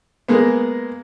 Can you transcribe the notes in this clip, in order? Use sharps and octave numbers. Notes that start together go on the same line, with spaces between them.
G#3 A#3 B3